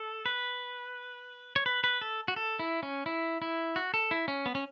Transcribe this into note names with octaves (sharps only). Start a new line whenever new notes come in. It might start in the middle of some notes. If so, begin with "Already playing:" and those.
Already playing: A4
B4
C#5
B4
B4
A4
F#4
A4
E4
C#4
E4
E4
F#4
A4
E4
C#4
B3
C#4